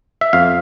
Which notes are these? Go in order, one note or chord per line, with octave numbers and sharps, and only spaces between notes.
E5
F2 F5